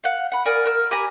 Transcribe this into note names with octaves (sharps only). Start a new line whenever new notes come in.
F5 F#5
F#5 B5
A#4 D5 G#5 D#6
A#4 E6
G4 G#5 A#5 B5